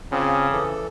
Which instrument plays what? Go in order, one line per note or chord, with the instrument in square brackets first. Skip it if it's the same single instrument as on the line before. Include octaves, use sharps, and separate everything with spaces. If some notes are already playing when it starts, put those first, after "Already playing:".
[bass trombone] C#3 [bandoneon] C4 C#4 F4 [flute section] A5 D6 D#6
[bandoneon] E3 A4